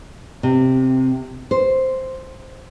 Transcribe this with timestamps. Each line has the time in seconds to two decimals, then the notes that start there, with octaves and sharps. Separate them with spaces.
0.43 C3
1.51 C5